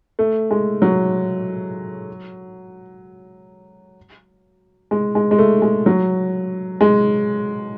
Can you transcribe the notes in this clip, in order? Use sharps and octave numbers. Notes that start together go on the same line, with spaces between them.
A3
G#3
F#3
G#3
G#3
G#3
A3
G#3
F#3
G#3